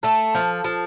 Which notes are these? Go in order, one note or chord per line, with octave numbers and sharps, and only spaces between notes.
A3 A4
F3
F3